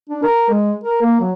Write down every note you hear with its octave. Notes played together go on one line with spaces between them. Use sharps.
D4
A#4
G#3
A#4
A#3
F#3